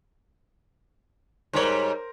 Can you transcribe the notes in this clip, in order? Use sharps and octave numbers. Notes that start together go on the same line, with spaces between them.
G#2 G3 A#4 C5 C#5